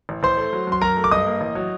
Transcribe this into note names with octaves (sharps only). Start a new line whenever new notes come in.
A1
A1 C5 C6
A3
F#3
F#2 C6
F#2 A#4 A#5
A3
D6
G2 D#5 D#6
A#3
A1
F#3